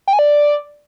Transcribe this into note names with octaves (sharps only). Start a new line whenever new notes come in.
G5
G#5
D5